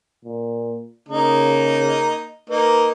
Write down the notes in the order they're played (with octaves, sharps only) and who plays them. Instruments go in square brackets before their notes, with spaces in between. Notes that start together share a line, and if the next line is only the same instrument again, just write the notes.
[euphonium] A#2
[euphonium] C#3 [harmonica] A#3 D#4
[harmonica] A#3 D#4 [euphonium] B4